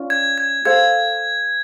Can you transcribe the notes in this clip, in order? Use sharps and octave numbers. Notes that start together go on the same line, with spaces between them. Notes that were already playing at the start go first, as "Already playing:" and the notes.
Already playing: C#4 F4 D5
G#6
G#6
A4 C5 F5 G#6